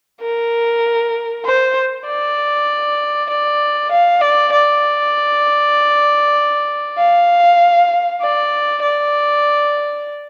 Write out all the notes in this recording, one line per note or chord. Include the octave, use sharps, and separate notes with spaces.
A#4
C5
D5
D5
F5
D5
D5
F5
D5
D5